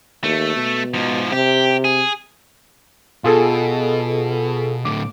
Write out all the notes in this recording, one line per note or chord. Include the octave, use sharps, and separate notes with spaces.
D#2 A3
B2
G#2 F3
C3 G4
G#4
B2 F4 G#4 A4
A2 D3 D6